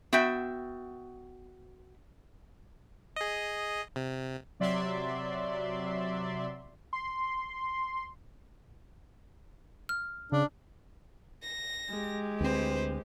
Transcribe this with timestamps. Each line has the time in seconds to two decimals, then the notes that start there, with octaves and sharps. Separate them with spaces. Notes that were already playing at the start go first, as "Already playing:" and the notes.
0.13 B3 F#4 E5 G5
3.16 G#4 D#5
3.96 C3
4.60 C3 F#3 D5 E5 C6
6.93 C6
9.89 F6
10.32 C#3 D4
11.43 A#6
11.90 G#3 G4
12.41 D2 C4 B4 C5